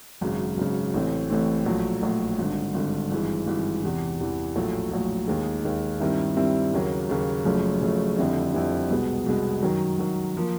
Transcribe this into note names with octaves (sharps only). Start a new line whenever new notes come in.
G#1 F#2 C#3
G#1 F#2 C#3
A1 A2 E3 A3 C4
A1 A2 E3 A3 C4
A#1 A2 F#3 A3
A#1 A2 F#3 A3
G#1 G2 D3
G#1 G2 D3
G#1 G2 E3 G#3
G#1 G2 E3 G#3
E2 C3 E3
E2 C3 E3
A#1 A2 F#3 A3
A#1 A2 F#3 A3
D#2 D#3 G#3
D#2 D#3 G#3
G2 D#3 G3 C4 E4
G2 D#3 G3 C4 E4
D#2 C#3 F#3 A#3
D#2 C#3 F#3 A#3
F#1 F#2 C#3 F3 A3
F#1 F#2 C#3 F3 A3
F2 D3 G3 C4 E4
F2 D3 G3 C4 E4
C2 B2 G#3 B3
C2 B2 G#3 B3
F#2 D#3 F#3
F#2 D#3 F#3
F3 A#3